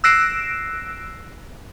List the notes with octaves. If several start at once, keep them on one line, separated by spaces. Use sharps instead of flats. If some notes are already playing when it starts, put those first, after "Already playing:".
E6 F#6 A#6 C7 D7 E7